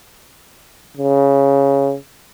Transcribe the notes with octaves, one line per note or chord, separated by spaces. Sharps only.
C#3